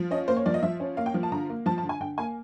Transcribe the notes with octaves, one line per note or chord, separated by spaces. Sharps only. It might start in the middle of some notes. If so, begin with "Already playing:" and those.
Already playing: F3
C#4 D#5
A#3 C5
C#5
F3 D5
D#5
F3 E5
C#4
A#3 F5
G5
F3
A5
D3 A#5
A#3
F3 A5
A5
D3
G#5
D3 G5
A#3 G#5